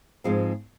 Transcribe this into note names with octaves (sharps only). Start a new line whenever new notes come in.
G#2 F3 G#3 C4